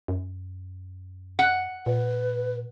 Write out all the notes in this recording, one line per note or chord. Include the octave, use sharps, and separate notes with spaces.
F#2
F#5
A#2 B4